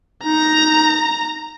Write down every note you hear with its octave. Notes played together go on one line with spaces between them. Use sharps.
D#4 A#5